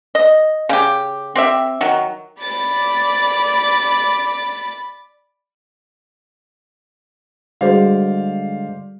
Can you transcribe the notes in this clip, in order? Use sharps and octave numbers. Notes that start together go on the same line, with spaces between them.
D#5
C#3 G4
C4 G4 E5
D#3 F#3
D5 B5 A6
D3 G3 G#3 F#4 G#4 C5 D5 F5